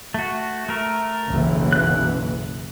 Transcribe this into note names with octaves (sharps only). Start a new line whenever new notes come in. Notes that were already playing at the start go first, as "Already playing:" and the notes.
A3 F#4
A3 A#4
F#1 B1 E3
F#6